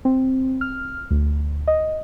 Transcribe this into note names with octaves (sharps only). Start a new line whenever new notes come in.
C4
F6
D2
D#5